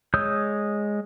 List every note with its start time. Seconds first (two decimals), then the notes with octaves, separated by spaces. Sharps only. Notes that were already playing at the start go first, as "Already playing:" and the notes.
0.14 G#3 C#5 D#6 E6 G6